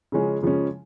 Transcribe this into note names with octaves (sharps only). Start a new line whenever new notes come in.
C#3 F3 G#3 C#4
C#3 F3 G#3 C#4